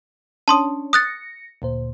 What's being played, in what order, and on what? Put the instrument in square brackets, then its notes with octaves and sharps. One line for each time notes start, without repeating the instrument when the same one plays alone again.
[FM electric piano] C#4 D4 C#5 [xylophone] A5 C6 D#6
[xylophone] D#6 F#6 A6 [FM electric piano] A#6 C#7
[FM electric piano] D2 A#2 C5